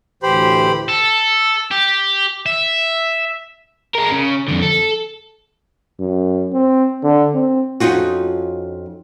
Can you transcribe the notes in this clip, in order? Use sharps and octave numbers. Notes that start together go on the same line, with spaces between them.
D2 A2 E3 G4 C5 B5
A4
G4
E5
G#3 A#4
C#3
F2 D3
A4
F#2
C4
D3
C4
F2 C#4 D#4 F4 F#4